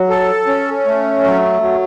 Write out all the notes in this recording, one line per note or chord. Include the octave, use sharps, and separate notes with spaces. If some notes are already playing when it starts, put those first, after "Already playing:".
Already playing: F#3
A4
C#4
A3
F#3
F#3